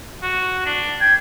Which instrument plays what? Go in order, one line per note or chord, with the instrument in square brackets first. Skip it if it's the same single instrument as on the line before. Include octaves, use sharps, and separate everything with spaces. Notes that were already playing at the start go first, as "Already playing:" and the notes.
[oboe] F#4
D4
[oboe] G5 [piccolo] G#6